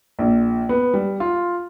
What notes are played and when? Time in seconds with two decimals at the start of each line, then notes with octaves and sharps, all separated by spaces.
0.19 A#1
0.69 B3
0.94 G3
1.20 F4